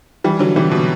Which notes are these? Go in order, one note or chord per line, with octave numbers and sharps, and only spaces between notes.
E3 G3
D3 F#3
C3 E3
B2